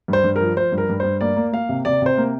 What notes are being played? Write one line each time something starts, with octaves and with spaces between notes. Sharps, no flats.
G2 C5
G2
F3 A#4
F3 C5
G2
A#4
G2
G2 C5
A#3 D5
A#3
A#3 F5
C3
C3 D5
C3 C5
A#3